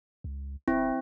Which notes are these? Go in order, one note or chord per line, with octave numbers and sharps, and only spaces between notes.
C#2
D1 C4 E4